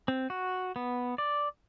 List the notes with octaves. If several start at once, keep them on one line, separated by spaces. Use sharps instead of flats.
C4
F#4
B3
D5